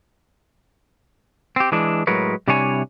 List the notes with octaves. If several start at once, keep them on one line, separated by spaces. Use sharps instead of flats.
C4 G4
E3 G#3 D4
A2 F#3 G#3 A#4 B4 C#5
C3 G3 D4 E4 C#5 G#5